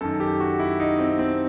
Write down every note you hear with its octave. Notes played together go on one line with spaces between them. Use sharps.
F#2 D#3 A4
G4
F#4
E4
D#4
C4
C4